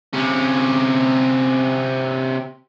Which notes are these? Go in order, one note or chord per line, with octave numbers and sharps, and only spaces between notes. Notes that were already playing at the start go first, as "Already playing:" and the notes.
C3 C#4